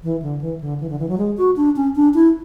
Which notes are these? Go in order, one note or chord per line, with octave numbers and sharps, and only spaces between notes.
E3
D3
E3
D3
E3
D3
E3
F#3
G#3
F#4
D4
C#4
D4
E4